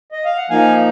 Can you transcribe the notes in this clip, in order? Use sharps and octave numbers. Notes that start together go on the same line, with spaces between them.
D#5
F5
F#5
F3 A#3 D#4 F5 G#5